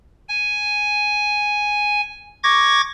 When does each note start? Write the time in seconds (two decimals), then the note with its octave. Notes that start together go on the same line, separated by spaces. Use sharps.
0.29 G#5
2.43 C#6 D6 G#6 A#6